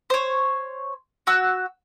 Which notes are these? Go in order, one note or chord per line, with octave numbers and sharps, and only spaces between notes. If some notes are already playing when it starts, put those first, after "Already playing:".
C5 C#5
F#4 E6